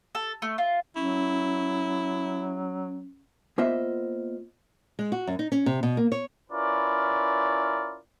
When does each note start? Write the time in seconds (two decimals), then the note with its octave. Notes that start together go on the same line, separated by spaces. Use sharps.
0.15 A4
0.42 A3
0.58 F4
0.96 F#3 C#4 E4
3.58 A#3 B3 F4 C5 D#5 E5
4.99 G#3
5.12 F#4
5.27 F#2
5.39 D#4
5.52 C#4
5.66 C3
5.83 B2
5.97 A#3
6.12 C#5
6.51 C#4 E4 F4 A#4 B4 D5